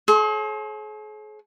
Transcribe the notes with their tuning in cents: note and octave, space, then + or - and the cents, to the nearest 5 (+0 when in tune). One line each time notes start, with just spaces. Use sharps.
G#4 +45 C#5 -40 C6 +20